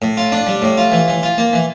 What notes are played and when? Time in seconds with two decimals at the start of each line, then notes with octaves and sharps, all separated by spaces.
0.02 A2
0.17 F4
0.32 D4
0.47 G3
0.62 A2
0.78 F4
0.92 E3
1.08 E3
1.23 F4
1.38 A#3
1.53 E3